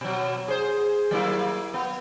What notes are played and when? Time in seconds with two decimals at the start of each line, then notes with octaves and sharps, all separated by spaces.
0.01 B2 F#3
0.48 G#4 C5
1.11 F#3 A#3 E4
1.74 B3